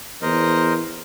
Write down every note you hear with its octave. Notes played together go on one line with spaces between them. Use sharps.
E2 A#4 C5 D#5